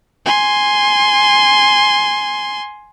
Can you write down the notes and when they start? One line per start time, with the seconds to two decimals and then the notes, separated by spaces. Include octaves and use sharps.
0.26 G#5 C6